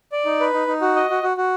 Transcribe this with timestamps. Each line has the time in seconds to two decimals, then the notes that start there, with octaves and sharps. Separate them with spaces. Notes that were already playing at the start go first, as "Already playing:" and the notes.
0.12 D5
0.25 D#4
0.40 B4
0.53 D#4
0.67 D#4
0.81 F#4
0.96 D#5
1.10 F#4
1.23 F#4
1.37 F#4